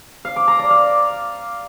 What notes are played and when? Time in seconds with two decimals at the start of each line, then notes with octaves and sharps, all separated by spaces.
0.25 F5
0.36 D6
0.48 A#5
0.59 D5
0.71 F5